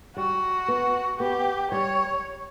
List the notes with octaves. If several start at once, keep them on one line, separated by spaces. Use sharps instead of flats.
G3 F#4
B3
B3 G4
G3 C#5